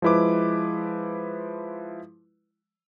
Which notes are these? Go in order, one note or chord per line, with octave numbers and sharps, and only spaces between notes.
F3 G#3 E4 B4 D6